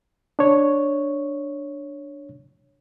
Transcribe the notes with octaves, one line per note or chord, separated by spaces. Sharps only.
D4 C#5